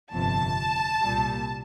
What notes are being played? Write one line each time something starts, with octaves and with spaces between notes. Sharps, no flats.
G1 F2 C3 A5
C2 A#2 G3